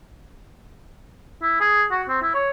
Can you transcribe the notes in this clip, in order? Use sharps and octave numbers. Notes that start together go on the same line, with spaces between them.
E4
G#4
F#4
C4
E4
C#5